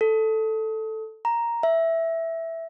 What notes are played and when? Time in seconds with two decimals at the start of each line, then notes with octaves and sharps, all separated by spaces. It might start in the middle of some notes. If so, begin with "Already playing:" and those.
0.01 A4
1.25 A#5
1.63 E5